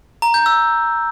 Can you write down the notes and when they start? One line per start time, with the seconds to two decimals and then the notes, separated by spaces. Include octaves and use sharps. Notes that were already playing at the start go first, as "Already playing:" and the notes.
0.22 A#5
0.34 G6
0.46 E6